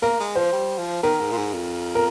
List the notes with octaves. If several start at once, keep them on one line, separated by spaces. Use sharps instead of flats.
A#3 A#4
G#3
F3 C5
G3
F3
D#3 A#4
G#2
A#2
G#2
F2
A#4